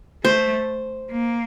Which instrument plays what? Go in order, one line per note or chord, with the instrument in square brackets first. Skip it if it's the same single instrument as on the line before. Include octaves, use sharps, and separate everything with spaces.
[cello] A3 [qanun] C5
[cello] A#3